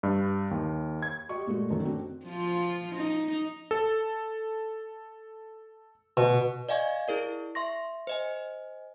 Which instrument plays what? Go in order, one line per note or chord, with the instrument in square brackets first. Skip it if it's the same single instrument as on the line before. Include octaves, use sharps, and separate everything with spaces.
[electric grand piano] G2
D#2
G#6
[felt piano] F#4 G4 D#5 C#6
A#2 G#3 A3 F#4
F#2 D#3 A3
C4 D4 F#4
[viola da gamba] F3 F4
D#4
[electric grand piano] A4
[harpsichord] B2
[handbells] D5 D#5 F5 G#5 C#6 G#6
E4 G#4 A#4 D5
E5 C6 C#6 A#6
C5 D#5 G#5